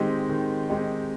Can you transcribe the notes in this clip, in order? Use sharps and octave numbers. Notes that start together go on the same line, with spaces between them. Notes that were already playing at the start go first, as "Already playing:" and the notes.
Already playing: D#3 G#3 C4 D#4 G4
D#3
G#3 C4 D#4 G4